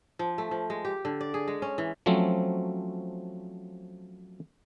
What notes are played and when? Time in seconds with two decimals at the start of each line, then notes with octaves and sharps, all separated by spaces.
0.19 F3
0.38 A3
0.51 F3
0.70 G#3
0.85 G4
1.05 D3
1.21 D5
1.34 G#4
1.48 G#3
1.62 C#4
1.78 E3
2.06 F3 F#3 A3 C4 C#4